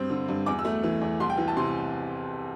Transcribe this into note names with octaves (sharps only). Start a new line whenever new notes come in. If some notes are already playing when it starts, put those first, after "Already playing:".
Already playing: G2 C4
D3
G2
E2 D6
E6
A3
E3
E2
C2 C6
G5
E3
A5
C3 C6